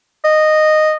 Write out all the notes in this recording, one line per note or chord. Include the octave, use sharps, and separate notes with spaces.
D#5